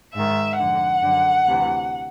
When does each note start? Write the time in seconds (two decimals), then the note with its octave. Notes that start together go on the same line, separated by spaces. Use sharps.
0.15 G#2 D#3 E5
0.58 F2 D3 F#5
1.02 F#2 D3
1.46 D2 C3 E3